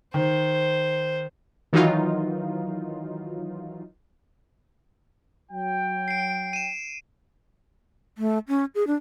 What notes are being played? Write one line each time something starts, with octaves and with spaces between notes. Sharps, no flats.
D#3 C5
D#3 E3 F#3 D#4 F4
F#3 G5
C7 D7
D#7 E7
A3
C#4
G#4
D4